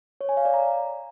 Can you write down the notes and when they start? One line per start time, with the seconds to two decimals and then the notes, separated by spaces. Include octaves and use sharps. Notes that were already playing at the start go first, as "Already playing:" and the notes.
0.21 C#5
0.29 G#5
0.37 F5
0.45 D5
0.54 A#5